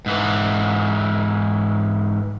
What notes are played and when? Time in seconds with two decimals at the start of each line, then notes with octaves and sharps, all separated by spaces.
0.06 G#2 E3